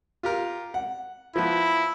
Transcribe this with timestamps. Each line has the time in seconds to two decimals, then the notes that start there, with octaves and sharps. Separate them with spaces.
0.23 F4 G4 A#4
0.74 F#5
1.36 F3 B3 E4